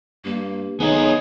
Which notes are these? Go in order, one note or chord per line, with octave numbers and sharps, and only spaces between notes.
G2 A#3
D#3 B3 D#4 G#4 C#5